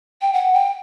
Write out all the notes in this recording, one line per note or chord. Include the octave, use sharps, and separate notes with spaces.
G5
F#5
G5